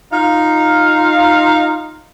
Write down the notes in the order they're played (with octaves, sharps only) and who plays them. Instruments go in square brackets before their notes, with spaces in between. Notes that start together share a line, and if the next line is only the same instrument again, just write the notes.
[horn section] D#4 F4 F5